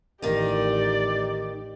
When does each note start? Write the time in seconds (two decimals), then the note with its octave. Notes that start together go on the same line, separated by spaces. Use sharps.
0.22 A1 D#3 D#4 G4 D5